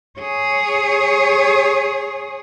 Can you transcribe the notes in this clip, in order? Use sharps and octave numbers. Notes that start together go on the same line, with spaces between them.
G#4 C#5